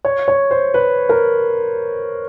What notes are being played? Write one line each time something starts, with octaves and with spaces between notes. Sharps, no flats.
C#5
C#5
C5
B4
A#4